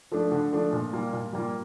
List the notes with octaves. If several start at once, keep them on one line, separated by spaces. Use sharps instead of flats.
F3 A3 D4
D3
F3 A3 D4
A#2
G3 A#3 F4
A#2
G3 A#3 F4